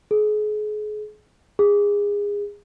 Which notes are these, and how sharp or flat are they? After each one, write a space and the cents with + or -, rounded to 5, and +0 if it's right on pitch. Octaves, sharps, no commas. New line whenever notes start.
G#4 +35
G#4 -25